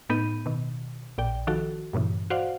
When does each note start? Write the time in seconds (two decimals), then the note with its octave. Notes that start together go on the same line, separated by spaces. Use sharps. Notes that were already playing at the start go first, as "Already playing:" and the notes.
0.10 A2 B3 D#4 B5 G6 D#7
0.46 B2 D#3
1.18 A#1 A#2 D5 G5
1.47 D#3 F3 F#4 A4
1.93 G2 A#2 C#3 E3
2.30 F#4 C5 D5 F5 F#5